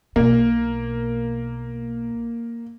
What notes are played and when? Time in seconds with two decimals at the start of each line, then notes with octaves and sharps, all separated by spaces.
0.16 B1 B2 A#3